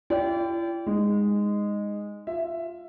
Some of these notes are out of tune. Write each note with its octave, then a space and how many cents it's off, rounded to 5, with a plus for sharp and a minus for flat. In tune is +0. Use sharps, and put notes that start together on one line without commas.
E4 +45 D5 -35 G5 +0
G#3 -15 D#4 +0
F4 +0 E5 +10